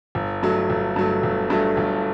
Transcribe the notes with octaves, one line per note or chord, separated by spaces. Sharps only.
G1
G2 F#3 A3
G1
G2 F#3 A3
G1
G2 F#3 A3
G1